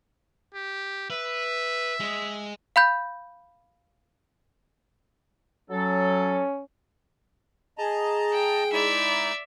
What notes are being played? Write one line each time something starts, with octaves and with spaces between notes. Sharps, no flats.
G4
B4 E5
G#3 G#4
F5 B5 G6
F#3 C#4 A4
G#4 D#5 A5 A#5
G5
G#3 D#4 E4 D5 E5